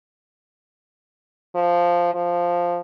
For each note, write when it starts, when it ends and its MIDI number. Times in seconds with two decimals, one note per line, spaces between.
1.55 2.13 53
2.14 2.81 53